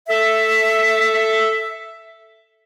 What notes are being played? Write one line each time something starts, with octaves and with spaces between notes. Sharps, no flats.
A4 E5